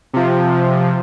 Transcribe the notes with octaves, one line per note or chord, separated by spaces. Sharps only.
C3 F3